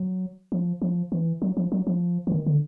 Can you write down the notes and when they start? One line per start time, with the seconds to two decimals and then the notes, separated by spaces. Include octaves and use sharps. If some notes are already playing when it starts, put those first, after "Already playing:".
Already playing: F#3
0.52 F3
0.82 F3
1.12 E3
1.42 F#3
1.57 F3
1.72 F#3
1.87 F3
2.27 E3
2.32 D#3
2.46 D3